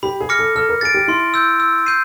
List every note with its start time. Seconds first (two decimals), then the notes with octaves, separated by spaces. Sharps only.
0.03 G4 B5
0.20 G#4
0.29 D6 F6 A#6 C#7
0.39 A4
0.55 A4 F6
0.69 A#4
0.81 G#4 A6 D7
0.94 G4
1.08 E4 C6
1.34 E6 G6
1.60 E6
1.86 G6 C7 D#7